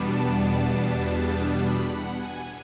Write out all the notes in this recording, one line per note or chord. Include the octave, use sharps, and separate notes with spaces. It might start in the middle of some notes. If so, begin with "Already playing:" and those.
Already playing: E2 B2 G3 B3 D4 A5
B5
F#5
G#5